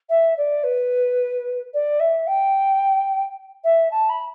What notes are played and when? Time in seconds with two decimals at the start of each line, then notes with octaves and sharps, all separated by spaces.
0.09 E5
0.37 D5
0.63 B4
1.73 D5
2.00 E5
2.27 G5
3.64 E5
3.91 A5
4.09 B5